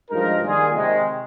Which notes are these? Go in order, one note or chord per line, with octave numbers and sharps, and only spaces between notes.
G2 F3 G#3 D#4 A#4
D#3 G3 A#3 F4 G#4
C3 D#3 G#3